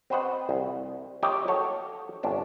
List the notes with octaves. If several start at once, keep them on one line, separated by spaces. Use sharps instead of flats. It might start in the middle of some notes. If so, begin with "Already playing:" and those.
C4 F#4 B4 C5 D#5 F#5
C2
A#3 F4 G4 C#5 D#5 E5
F#4 A4 C#5 F5
G1 C3 C#4 D4 A5